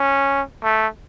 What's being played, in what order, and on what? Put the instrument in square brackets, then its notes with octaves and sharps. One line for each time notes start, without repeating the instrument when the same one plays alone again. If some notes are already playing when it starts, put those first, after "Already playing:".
Already playing: [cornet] C#4
A3